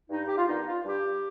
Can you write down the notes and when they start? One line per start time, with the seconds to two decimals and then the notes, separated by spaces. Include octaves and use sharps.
0.10 G2 D#4
0.28 G4
0.38 F4
0.47 D#3 B3 D4 D#4
0.66 F4
0.84 G2 G4